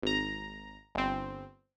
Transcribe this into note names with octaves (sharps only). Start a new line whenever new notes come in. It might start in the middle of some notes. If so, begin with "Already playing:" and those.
G#1 A#5
G1 C4